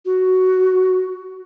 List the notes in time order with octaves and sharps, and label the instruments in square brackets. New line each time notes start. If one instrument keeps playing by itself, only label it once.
[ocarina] F#4